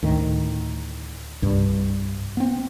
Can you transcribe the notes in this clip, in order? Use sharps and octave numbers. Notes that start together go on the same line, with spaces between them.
D2 A2 D#3
C2 G2
B3 C4